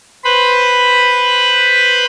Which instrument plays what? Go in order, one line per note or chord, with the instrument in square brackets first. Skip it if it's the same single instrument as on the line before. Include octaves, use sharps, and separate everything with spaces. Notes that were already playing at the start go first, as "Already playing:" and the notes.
[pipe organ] B4 C5 B5